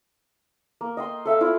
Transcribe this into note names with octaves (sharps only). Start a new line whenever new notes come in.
A#3
D#5 G5 C6
A4 E5 F5
E4 F4 D5